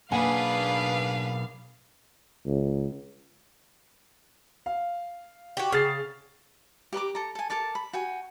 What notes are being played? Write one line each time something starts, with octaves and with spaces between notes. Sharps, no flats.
B1 A#3 D4 G#4 B4 F5 F#5 G#5
C#2
F5
F#4 G4
C#3 F6 A6 C7
G4 B4 A#5 D6
A4 A#5
A4 G#5
A4 A#4 A5 D6
B5
F#4 G5 G#5